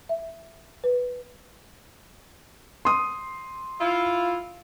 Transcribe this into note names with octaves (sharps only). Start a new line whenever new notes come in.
E5
B4
C6 D#6
E4 F4